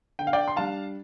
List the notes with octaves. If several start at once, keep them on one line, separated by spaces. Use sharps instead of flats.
D3 G5
F5
D5 G5
C6
G3 D4 F5 A5